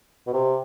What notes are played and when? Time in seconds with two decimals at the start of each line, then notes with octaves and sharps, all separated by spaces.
0.27 B2
0.33 C3